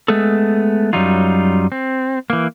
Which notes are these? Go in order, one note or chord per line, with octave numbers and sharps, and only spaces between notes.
G#3 A3 B3 G#4 A4
F#2 F#3 G3 D#4 F4
C4
E3 A#3